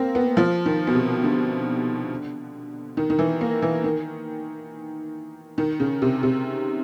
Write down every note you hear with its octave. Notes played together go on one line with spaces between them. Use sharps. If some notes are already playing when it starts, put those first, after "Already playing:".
Already playing: A#3 C4
B3
F3
D#3
B2
C3
D3
D#3
D#3
E3
A#3
E3
D#3
D#3
C#3
C3
C3